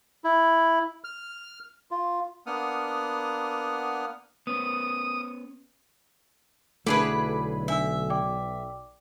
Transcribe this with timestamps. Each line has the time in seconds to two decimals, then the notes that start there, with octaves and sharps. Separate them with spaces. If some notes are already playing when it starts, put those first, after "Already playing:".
0.24 E4
1.04 F6
1.91 F4
2.46 A#3 B3 D4 F#5 D#6 F6
4.47 B3 C#4 D#6
6.87 B1 D3 A3 E4 G#4 B4 D6 D7
7.68 D4 E5 G#5 E6
8.10 D5 G5 D6